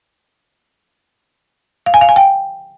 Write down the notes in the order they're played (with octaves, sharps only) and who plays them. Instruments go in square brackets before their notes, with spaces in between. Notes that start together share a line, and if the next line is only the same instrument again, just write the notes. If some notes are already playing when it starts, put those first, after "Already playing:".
[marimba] F5
G#5
F5
G#5
G5